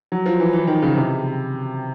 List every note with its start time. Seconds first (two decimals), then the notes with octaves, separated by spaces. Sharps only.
0.12 F#3
0.26 F3
0.40 E3
0.53 E3
0.67 D#3
0.82 C#3
0.96 C3